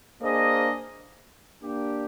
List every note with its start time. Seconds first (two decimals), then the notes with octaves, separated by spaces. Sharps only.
0.22 A#3 D4 G#4 C5 D#5
1.62 A#3 D4 G4